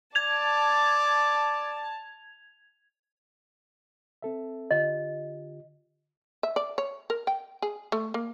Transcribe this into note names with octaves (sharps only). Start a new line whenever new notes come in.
D5 A5 G#6 F7
C4 A4 E5
D3 F4 G4 D#5
E5
D5
C#5
A#4
G5
G#4
A3
A#3